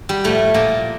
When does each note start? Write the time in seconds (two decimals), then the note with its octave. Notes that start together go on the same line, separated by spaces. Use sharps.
0.09 G3
0.24 A2 F3 A3
0.54 A#2 F3 A#3